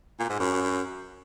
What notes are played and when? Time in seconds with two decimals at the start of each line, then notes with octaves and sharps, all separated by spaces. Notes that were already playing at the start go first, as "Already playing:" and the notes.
0.20 A#2
0.30 G#2
0.40 F#2